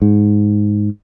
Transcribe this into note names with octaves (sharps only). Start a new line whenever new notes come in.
G#2